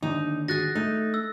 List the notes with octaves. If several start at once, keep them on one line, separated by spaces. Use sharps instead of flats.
D#2 D3 D#4
F#4 G#4 F#6 A6 A#6
A3 D#4
E6